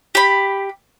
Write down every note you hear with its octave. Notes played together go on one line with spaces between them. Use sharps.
G4 B5